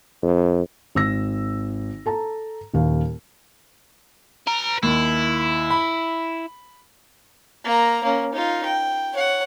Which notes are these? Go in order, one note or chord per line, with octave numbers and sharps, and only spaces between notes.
F2
G#1 E6 A#6
A4 A5 A#5
D#1 D#2 F5
B4 A#5
D#2 E4
B5
A#3 A#5
A#3 C#4
D#4 F4
G5
C#5 F#5